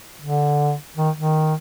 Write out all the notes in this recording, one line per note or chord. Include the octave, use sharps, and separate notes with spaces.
D3
D#3
D#3